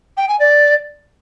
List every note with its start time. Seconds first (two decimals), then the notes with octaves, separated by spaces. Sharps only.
0.17 G5
0.28 G#5
0.39 D5